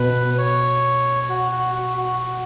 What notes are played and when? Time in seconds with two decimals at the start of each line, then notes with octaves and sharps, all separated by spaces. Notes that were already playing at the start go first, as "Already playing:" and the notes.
Already playing: B2 B4
0.38 C#5
1.30 F#4
1.52 F#4
1.75 F#4
1.97 F#4
2.20 F#4